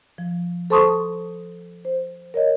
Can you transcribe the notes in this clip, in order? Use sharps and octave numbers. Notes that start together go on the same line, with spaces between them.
F3
A4 C5 A5 C6 C#6 D#6
C5
A#4 C#5 D#5